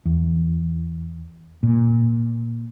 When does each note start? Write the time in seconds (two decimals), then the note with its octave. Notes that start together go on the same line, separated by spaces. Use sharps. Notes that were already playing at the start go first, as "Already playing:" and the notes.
0.05 E2
1.63 A#2